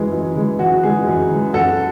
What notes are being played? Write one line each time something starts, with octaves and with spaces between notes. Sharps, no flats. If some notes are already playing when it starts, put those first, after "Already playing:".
Already playing: F#2 E3 G#3
F#2
E3 G#3
F#2 F#4
E3 G#3 G#4
F#2
E3 G#3
F#2 F#4 A4